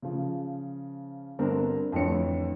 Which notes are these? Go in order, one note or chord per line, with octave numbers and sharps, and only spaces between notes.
C#3 F3
G1 B3 C4 D4 A#4
F2 A2 D3 E3 C#5 C#7